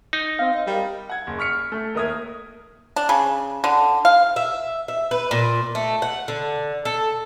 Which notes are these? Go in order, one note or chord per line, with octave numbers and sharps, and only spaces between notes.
D#4
C4 F5
D#5
G3 A#4
F#5 G#6
F#1
C#6 F6 B6 C#7
A3
D#2 A#4 E5 D#6 F6 G#6
D4
C#3
D3
F5
E5
E5
B4
A#2
A3
F#5
D3
A4